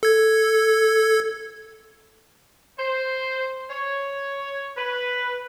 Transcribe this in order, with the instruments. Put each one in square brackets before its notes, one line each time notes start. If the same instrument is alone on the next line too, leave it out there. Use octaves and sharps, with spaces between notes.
[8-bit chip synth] A4 G#6
[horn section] C5
C#5
B4